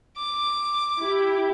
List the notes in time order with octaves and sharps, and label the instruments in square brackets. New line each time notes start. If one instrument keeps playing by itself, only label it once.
[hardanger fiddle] D6
[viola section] E4 G4